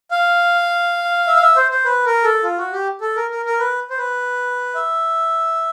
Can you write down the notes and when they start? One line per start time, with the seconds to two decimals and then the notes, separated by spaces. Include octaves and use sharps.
0.11 F5
1.27 E5
1.36 F5
1.42 E5
1.56 C5
1.71 C5
1.85 B4
2.05 A#4
2.24 A4
2.43 F4
2.58 F#4
2.72 G4
3.01 A4
3.16 A#4
3.31 A#4
3.46 A#4
3.60 B4
3.90 C5
3.97 B4
4.75 E5